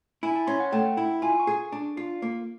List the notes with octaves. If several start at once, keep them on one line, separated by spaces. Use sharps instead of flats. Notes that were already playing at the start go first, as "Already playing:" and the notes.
E4 G#5
A5
C#4 C6
F#5
A3 G5
E4
F4 G#5
C#6
G#4
D4
F4
A#3